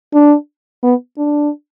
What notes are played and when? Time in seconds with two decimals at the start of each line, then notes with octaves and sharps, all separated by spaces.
0.14 D4
0.83 B3
1.18 D4